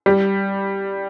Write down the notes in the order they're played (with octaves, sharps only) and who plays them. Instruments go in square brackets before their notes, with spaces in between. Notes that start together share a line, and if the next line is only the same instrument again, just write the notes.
[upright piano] G3